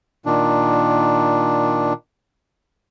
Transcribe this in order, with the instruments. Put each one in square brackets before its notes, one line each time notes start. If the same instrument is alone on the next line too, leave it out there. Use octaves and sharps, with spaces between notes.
[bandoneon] A#2 D#3 D4